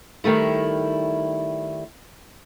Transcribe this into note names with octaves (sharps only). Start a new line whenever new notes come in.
D#3 G3 A3 E4